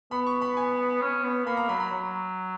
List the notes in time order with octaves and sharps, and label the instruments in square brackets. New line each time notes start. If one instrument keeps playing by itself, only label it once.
[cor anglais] B3 [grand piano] B5
[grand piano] C#6
B5
G#5
[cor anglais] C#4
B3
[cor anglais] A#3 [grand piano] B5
[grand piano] A#5
[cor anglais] F#3 [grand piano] B5
[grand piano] B5
[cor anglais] F#3